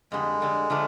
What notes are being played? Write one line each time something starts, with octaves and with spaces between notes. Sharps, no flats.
F2 D3 G3 G#3
F2 D3 G3
D3 F3 A3 D4